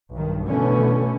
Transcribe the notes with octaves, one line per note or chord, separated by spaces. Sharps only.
B1 G2 D#3
B2 D3 E3 A3 B3 C#4